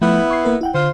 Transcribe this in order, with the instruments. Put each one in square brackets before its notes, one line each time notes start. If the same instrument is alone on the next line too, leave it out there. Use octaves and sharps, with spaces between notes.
[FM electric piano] F3 A3 G6 [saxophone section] B3 E4
[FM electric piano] C#6 G#6 C7
A#3 A#4 B4
E4 F#5 G5
[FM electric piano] D3 [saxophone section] F4 C5